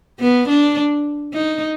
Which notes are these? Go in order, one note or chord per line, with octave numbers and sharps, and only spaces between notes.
B3
D4
D#4